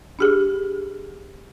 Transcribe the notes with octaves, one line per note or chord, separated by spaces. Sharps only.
D4 G4 G#4